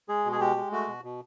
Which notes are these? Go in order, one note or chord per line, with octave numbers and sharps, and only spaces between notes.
G#3 G#4
B2
G#4
G#3 G4
G#3
A3 F#4
B2
B2